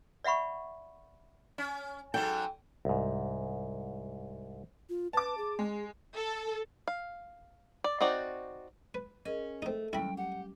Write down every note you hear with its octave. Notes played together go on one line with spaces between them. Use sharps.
D5 E5 F#5 B5 C#6
C#4
G#2 F#3 A4 G5
C2 G#2
F4
B4 A5 D6
G#4
G#3
A4
F5
D5
C4 D#4 F#4 D5
B4
C#4 G#4 A#4 D#5
A3 C4 D#4
D#2 F#3 G3 C#4 E4 G5 B5
G4 F#5